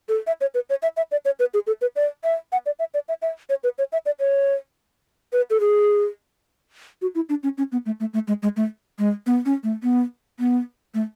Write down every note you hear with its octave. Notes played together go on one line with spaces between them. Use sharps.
A4
E5
C#5
B4
C#5
E5
E5
D5
C#5
B4
G#4
A4
B4
D5
E5
F#5
D5
E5
D5
E5
E5
C#5
B4
C#5
E5
D5
C#5
B4
A4
G#4
F#4
E4
D4
C#4
C#4
B3
A3
A3
A3
G#3
G#3
A3
G#3
B3
C#4
A3
B3
B3
A3